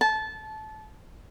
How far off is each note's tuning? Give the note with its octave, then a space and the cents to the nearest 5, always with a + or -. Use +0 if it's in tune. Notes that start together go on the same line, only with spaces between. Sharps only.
A5 -20